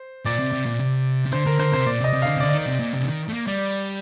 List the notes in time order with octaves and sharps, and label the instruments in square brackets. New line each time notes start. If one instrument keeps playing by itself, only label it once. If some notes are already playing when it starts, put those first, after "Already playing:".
Already playing: [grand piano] C5
[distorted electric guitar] A#2 [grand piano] D5
[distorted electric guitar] C3
C3
A#2
C3
C3
[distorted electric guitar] D3 [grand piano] C5
[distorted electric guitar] D3 [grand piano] A#4
[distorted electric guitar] D3 [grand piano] C5
[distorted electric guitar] C3 [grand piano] C5
[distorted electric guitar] A#2 [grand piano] D5
[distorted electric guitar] C3
[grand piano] D#5
[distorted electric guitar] C3
[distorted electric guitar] D3 [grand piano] F5
[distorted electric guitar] C3
[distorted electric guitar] D3 [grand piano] D5
[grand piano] D#5
[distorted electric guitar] D#3
[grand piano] D5
[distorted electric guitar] C3
A#2
C3
D3
D#3
A3
A#3
[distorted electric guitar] G3 [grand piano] D5